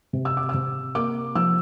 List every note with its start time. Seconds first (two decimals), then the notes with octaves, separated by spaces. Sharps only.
0.13 C3
0.25 E6
0.37 D6
0.49 E6
0.54 C3
0.95 A#3 D6
1.35 F3 E6